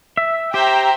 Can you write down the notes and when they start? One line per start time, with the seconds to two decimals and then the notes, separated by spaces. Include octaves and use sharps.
0.17 E5
0.54 G4 C5 E5 G5 A#5